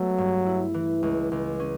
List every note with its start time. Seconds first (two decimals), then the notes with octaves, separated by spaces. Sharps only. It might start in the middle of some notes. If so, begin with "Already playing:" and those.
Already playing: F#3 A3 B3
0.18 G2
0.46 E4
0.74 E3
1.03 C#2
1.32 C#2
1.60 C#4